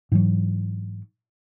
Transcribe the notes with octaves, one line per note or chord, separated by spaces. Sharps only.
G#2 E3 F#3